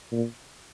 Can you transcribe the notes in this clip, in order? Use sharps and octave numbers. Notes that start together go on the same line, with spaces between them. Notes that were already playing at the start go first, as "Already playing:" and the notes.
A#2